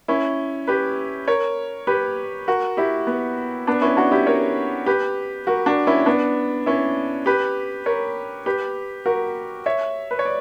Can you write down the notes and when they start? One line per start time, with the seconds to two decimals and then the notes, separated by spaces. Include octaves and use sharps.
0.08 C#4 E4
0.67 G4 B4
1.28 A#4 C#5
1.87 G4 B4
2.48 F#4 A#4
2.77 E4 G4
3.07 B3
3.67 B3 D4
3.82 C#4 E4
3.97 D4 F#4
4.12 E4 G4
4.27 A#4 C#5
4.86 G4 B4
5.47 F#4 A#4
5.66 D4 F#4
5.87 C#4 E4
6.06 B3 D4
6.66 C#4 E4
7.26 G4 B4
7.86 A#4 C#5
8.46 G4 B4
9.06 F#4 A#4
9.66 C#5 E5
10.11 B4
10.19 C#5
10.25 D5